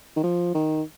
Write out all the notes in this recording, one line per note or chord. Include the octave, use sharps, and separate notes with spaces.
D#3
F3
D#3